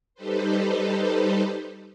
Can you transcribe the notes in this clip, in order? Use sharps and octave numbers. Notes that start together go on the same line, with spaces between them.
G3 D#4 G4 A4 B4 C5